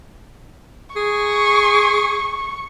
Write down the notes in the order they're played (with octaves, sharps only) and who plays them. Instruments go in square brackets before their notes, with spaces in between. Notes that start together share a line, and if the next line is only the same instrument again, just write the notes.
[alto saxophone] G#4 [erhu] C#6